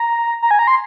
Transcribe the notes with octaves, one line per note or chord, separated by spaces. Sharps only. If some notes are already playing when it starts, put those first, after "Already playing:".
Already playing: A#5
A#5
G#5
A#5
C6